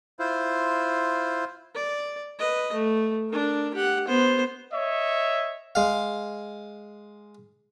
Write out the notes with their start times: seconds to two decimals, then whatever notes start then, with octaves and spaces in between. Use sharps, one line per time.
0.19 E4 F4 C5
1.75 D5
2.39 B4 D#5
2.73 A3
3.29 D4 A#4
3.75 G4 F#5
4.08 B3 C5
4.72 C#5 D#5 E5
5.75 G#3 F5